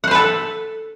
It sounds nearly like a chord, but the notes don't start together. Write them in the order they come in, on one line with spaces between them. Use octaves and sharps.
F#5 C5 B4 A4